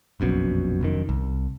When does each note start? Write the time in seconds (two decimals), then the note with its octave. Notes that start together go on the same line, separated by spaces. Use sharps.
0.20 F1 A#1 F#2 B2
0.81 F1 F#2 D#3
1.09 C2